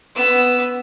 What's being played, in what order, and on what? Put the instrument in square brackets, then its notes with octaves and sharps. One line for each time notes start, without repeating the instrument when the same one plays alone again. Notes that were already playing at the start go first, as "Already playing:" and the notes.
[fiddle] B3 E6